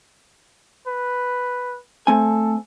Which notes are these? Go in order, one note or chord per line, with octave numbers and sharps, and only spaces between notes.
B4
A3 C4 A4 G#5